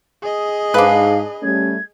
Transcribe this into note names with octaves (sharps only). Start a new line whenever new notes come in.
G#4 D#5
G#2 D4 B4 F5
G3 A3 C#4 G#6